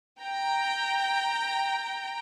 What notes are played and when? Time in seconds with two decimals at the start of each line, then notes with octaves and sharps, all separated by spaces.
0.21 G5 A#5